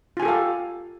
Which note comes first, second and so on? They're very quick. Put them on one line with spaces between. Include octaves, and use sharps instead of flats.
F4 G#5 G4 A4 F5